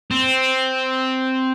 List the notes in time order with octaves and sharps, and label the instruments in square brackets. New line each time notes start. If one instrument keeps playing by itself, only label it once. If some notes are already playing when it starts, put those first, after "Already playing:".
[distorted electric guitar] C4